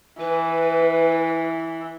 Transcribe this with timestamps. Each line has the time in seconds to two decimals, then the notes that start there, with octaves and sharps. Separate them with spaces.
0.20 E3 B4